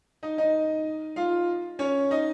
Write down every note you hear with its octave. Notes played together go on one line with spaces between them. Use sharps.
D#4 D#5
D#4 D#5
F4 F5
C#4 C#5
D#4 D#5